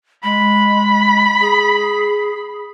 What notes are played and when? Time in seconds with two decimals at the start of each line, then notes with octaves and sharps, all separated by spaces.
0.23 G#3 B5
1.41 G#4